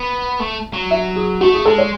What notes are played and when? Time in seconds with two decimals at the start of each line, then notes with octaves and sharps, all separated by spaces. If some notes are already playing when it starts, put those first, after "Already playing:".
Already playing: B3
0.40 A3
0.74 F#3
0.91 E5
1.16 G#4
1.41 A3 F#4
1.54 G#4
1.66 G#3 A4
1.78 C#5